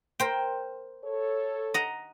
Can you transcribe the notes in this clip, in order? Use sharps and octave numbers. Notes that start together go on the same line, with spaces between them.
A#4 C5 G5
A4 C#5
D#5 F#5 A#5